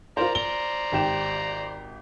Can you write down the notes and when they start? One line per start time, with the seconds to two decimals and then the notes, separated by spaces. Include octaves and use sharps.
0.17 F4 A#4 C5 D5 A#5
0.35 C5 D5 A#5 G7
0.92 G#1 G4 E7